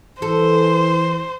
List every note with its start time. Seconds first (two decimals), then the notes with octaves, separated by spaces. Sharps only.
0.22 E3 A4 C5